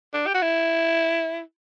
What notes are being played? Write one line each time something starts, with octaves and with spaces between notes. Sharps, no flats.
D4
G4
F#4
E4